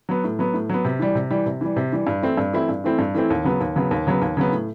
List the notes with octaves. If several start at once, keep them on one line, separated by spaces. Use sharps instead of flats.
F#3 B3
A2
F#3 B3
A2
F#3 B3
C3
E3 G3
C3
E3 G3
C3
E3 G3
C3
E3 G3
G2
E3 A3 C4 E4
G2
E3 A3 C4 E4
G2
E3 A3 C4 E4
G2
E3 A3 C4 E4
D#2
C#3 F#3 B3
D#2
C#3 F#3 B3
D#2
C#3 F#3 B3
D#2
C#3 F#3 B3
A2